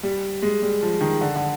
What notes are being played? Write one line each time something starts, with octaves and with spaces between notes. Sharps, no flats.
G3
G#3
G3
F3
D#3
D3
D3